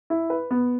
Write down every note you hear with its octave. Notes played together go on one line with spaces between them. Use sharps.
E4
B4
B3